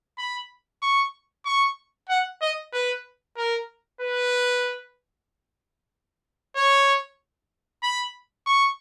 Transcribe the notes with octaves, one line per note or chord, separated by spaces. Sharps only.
B5
C#6
C#6
F#5
D#5
B4
A#4
B4
C#5
B5
C#6